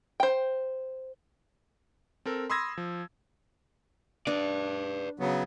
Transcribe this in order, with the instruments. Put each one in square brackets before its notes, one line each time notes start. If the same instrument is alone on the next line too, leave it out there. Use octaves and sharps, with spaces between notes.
[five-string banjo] C5 G5
[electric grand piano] C4 A4 A#4
B5 C6 D#6 E6 G#6 A#6
F3
[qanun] D4 [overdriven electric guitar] B4 D5
[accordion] C#3 F#3 B3